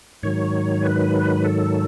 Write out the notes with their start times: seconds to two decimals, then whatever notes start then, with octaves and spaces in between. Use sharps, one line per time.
0.23 G#2 D#3 F#3 C#5
0.83 B4
1.44 A4